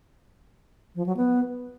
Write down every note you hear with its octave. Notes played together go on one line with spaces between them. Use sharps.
F3
F#3
B3